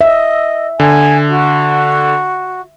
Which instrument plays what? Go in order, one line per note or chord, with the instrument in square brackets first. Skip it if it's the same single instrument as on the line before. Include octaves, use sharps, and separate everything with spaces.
[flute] D#5 [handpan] E5
[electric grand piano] D3 [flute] G#5
[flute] F#4